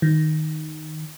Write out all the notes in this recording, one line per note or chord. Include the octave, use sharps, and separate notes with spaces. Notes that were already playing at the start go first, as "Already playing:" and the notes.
D#3